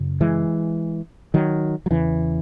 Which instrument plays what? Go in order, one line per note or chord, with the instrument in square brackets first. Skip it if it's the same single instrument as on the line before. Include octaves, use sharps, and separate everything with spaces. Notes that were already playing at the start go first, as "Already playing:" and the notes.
Already playing: [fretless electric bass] F#2 C#3
E3 G#3
D#3 F#3
F#3
E2 C#3 E3